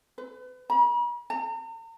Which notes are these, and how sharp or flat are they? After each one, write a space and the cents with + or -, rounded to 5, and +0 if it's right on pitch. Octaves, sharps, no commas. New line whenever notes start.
B4 +35
B5 -45
A#5 -40